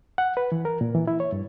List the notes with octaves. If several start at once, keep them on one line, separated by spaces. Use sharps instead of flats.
F#5
B4
E3
A#4
A#2
E3
E4
C#5
G2